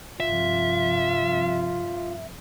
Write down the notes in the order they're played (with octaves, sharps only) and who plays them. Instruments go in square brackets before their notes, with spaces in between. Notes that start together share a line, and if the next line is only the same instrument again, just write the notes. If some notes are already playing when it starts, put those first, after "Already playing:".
[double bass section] G2 C3 F3 [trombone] F4 [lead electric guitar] E5